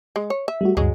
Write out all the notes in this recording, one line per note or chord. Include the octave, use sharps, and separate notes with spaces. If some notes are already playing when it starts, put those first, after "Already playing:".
G#3
C#5
E5
G3 A3 F#4
D2 G2 F#3 G#3